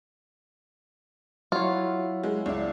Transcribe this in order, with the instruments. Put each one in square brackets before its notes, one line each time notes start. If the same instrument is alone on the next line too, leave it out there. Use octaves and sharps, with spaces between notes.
[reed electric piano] F#3 C#5 [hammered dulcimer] E4 F5 F#5 [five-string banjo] F4
[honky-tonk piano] G#3
[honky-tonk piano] C#2 E4 [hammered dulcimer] D4